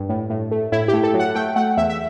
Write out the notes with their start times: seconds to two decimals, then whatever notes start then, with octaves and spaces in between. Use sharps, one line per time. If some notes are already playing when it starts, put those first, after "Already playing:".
Already playing: G2
0.09 A2
0.30 A2
0.51 A3
0.72 A2 E4
0.88 G4
0.93 A3
1.03 A4
1.14 F#3
1.20 F#5
1.35 A3 G5
1.56 A3 F#5
1.77 E2 E5
1.90 E5